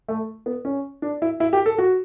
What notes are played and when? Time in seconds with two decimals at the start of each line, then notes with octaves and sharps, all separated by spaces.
0.08 A3
0.46 B3
0.65 C#4
1.02 D4
1.22 E4
1.40 E4
1.53 G4
1.66 A4
1.78 F#4